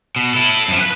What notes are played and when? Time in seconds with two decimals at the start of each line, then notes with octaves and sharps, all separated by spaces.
0.16 B2
0.34 E4 A4
0.68 F#2 F3
0.80 B4